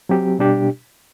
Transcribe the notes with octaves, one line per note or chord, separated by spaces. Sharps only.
F#3 C4 G4
B2 G3 D4 G4